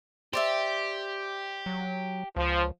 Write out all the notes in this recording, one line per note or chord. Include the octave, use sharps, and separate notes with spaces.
G4 C5 D5 E5
F#3
C#2 F3